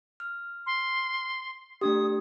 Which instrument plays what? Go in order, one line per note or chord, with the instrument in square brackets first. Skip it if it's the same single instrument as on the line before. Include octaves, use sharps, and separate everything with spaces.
[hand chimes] F6
[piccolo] C6
[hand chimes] A3 D4 G4 [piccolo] D#6